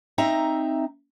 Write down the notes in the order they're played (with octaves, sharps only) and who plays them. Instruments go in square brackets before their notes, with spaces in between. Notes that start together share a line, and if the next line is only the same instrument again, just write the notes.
[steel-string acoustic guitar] C4 D#4 E5 A#5